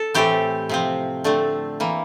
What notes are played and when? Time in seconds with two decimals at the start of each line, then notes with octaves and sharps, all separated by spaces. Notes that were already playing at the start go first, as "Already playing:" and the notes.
Already playing: A4
0.14 A2 E3 A3 C4 G4
0.69 C3 F3 C4
1.24 D3 A3 C4
1.80 E3 A#3